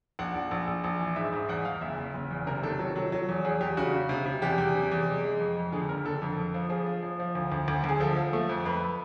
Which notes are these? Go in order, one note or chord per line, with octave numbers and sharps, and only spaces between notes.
A#1 F#5
A#1
A#1
A#1
A#1
E3
G#2 E5
G#2
E2 F#5
E2 F5
F#1 E5
F#1
F#1
E2
C3 A#4
D#3 A4
F#3
F#3
F#3
E2
E2 G#4
E2 G4
C#3 F#4
C#3
C3
C3
E2 G4
E2
C3
E2
G#3
G#3
F2
F2
D3 G#4
F#1 A#4
D3 A4
F2
F2
F3
F3 G#4
F3
F3
F3
D2
D2
D2
D2 G#4
F3 A4
F3
A3
F2
F2 B4